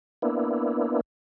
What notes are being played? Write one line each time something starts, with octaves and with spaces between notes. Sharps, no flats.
A#3 B3 D4 E4